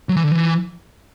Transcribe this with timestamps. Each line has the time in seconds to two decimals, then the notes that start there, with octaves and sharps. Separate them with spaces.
0.09 F#3
0.16 E3
0.24 D3
0.31 E3